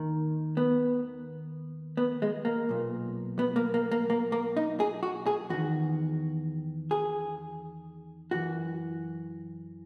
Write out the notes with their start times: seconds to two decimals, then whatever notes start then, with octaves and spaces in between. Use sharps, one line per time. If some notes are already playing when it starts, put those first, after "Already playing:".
Already playing: D#2 D#3
0.57 B3
1.97 B3
2.22 G#3
2.45 A#3
2.69 B1 A#2
3.39 B3
3.56 A#3
3.74 A#3
3.91 A#3
4.10 A#3
4.32 A#3
4.57 D#4
4.80 G#4
5.03 F#4
5.27 G#4
5.50 E2 D#3 F#4
6.91 G#4
8.31 F#2 E3 F#4